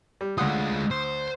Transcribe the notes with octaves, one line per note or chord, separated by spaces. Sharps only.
G3
D2 G#3 F4 F#5 D#6
C5 C6